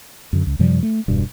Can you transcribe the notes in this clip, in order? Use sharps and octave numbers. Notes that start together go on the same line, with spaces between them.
F#2 D3
C#2
F#2 C3 F3 G3
A3
E1 G2 B2